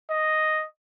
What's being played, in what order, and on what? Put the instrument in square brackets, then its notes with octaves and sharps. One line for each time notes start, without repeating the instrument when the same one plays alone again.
[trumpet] D#5